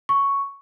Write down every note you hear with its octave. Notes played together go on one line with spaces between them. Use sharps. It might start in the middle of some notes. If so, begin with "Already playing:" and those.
C#6